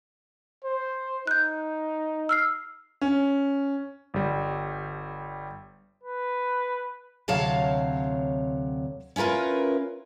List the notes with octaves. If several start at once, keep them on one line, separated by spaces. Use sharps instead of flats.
C5
D#4 F#6 G6
E6 F6 C7
C#4
G1 G3
B4
D2 C3 F#3 C#5 F5 A5
C#4 E4 F4 A#4 B4